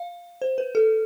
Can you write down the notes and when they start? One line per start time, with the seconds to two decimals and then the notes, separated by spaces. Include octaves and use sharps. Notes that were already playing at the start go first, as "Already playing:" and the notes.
Already playing: F5
0.42 C5
0.58 B4
0.75 A4